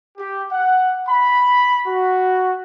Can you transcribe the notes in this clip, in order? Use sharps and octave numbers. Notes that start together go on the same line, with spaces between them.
G4
F#5
B5
F#4